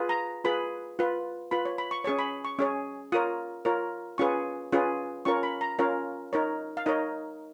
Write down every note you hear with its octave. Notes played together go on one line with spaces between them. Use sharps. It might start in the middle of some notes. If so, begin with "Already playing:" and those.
Already playing: F4 G#4 B4
A#5
F4 G#4 B4 B5
F4 B4
F4 B4 B5
C#5
B5
C#6
C#4 G#4 C#5 C#6
B5
C#6
C#4 G#4 C#5
F4 A#4 C#5 D#6
F4 A#4 C#5
C#4 F4 G#4 B4 C#6
C#4 F4 G#4 B4
C#4 F4 A#4 C#5 C#6
B5
A#5
C#4 F4 A#4 C#5 F5
D#4 A#4 C#5
F5
D#4 A#4 C#5 D#5